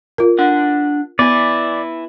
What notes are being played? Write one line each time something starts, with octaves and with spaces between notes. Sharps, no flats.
F4 A#4
D4 F#5
B3 E4 B4 D5